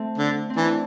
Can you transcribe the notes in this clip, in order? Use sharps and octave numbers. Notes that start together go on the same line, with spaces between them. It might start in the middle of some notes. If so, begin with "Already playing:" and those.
Already playing: A3 C4
D3
C4
E3 D4